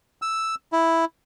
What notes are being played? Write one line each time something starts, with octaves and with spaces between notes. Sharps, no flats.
E6
E4